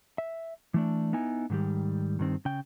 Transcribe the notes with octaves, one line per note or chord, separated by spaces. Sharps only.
E5
E3 A3 D4
B3 D#4 E4 G#5
G#2 D#3 G3
G2 D#3 C4
C#3 G5